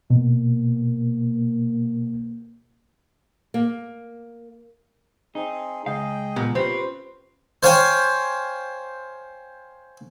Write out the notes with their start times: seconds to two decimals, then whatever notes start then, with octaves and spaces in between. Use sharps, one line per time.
0.10 B2 A#3
3.54 A#3
5.35 C4 D#4 G#4
5.86 C#2 G#4 D#5 F5 G5
6.36 A#2 F3 B3
6.55 C4 C#4 F4 G4 B4
7.63 C5 C#5 F5 G5 G#5